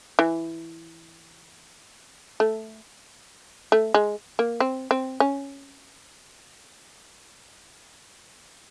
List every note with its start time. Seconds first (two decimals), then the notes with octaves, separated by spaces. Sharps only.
0.19 E3
2.40 A3
3.72 A3
3.94 G#3
4.39 A#3
4.60 C4
4.91 C4
5.20 C#4